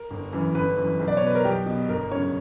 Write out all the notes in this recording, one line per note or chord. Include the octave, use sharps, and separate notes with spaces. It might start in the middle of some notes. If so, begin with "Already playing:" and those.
Already playing: A#4
G1
F#2 E3
G1 B4
F#2 E3
B1
D5
C#5
B2 B4
A#4
B1 G4
B2
G1 A#4
F#2 C#3 C#5